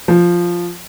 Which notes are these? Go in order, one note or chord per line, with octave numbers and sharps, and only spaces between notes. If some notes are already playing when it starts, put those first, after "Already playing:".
F3